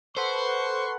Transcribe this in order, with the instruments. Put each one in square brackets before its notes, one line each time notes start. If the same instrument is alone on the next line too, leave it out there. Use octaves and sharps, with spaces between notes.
[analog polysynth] A4 B4 F#5 [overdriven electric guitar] C5 [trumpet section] C6 C#6